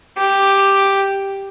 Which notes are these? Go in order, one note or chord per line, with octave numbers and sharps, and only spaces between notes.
G4